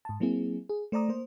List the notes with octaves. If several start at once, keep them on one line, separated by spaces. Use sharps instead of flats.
G#2 A5
F#3 A#3 C4 E4 G#4
G#4
A3 C5 D5 A#5 D#6
A#3 C5